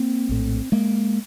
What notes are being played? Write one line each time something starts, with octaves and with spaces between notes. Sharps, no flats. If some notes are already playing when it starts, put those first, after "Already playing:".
Already playing: A#3 C4
A#1 A2
G#3 A#3